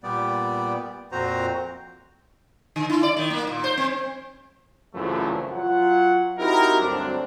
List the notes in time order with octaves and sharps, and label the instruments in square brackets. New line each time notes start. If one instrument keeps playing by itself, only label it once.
[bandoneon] A#2 G3 B3 D5
F2 A#2 C4 F#4 C5 A#5
[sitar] D3
E4
D5
D#3
A#3
A#2
C5
C4
[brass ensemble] C2 F#2 C#3 E3 F3 A3
F#3 F4 F#5
C4 D#4 E4 F#4 G4 A#4
D2 G2 F#3 C4 D4